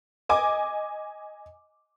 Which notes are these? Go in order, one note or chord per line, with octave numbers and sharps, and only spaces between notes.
D#5 G#5 D6